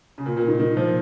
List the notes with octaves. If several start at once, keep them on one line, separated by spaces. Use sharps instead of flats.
C#3
A#2
A#2
D#3
D#3
F3